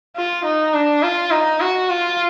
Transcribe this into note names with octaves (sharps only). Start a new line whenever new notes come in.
F4
D#4
D4
F4
D#4
F#4
F4